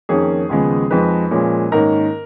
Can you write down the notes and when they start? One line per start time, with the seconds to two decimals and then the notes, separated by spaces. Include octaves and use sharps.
0.09 F2 D#3 A#3 C#4 G#4
0.49 D#2 C#3 F3 G#3 B3
0.91 F2 F3 G#3 D#4 B4
1.31 A#2 F3 G#3 C#4
1.72 G#2 D#3 A#3 C#4 A#4